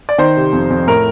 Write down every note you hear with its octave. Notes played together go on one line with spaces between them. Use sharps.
D5
D#3 C5
C3
F2
F2
A2 A#4